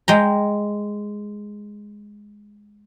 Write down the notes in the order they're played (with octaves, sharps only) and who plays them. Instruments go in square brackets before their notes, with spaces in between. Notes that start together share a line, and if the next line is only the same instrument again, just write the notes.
[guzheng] G#3 G5 A#5